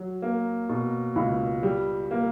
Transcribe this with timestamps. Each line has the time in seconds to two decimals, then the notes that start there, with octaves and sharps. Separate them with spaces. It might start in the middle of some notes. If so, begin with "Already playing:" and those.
Already playing: F#3
0.22 A#3
0.69 B2
1.16 C#2
1.63 G3
2.11 A#3